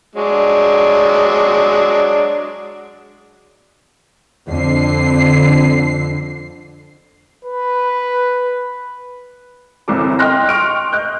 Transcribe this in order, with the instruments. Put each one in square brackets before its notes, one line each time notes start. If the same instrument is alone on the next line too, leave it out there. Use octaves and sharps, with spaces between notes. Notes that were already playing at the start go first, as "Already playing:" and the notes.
[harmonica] F#3 G#3 D4
[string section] F2 D3 C7
[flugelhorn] B4
[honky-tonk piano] G1 C2 E3 C4 A4 D6
D#5 G5 C6 F6 F#6 A#6
C6 C#6 F6 D7
D#5 F#6 G6